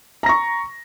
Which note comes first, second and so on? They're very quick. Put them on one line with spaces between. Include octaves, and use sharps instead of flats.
A#5 A#6 C#6